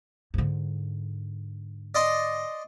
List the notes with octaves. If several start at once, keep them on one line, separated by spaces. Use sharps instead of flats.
G#2 D3
D5 D#5 C6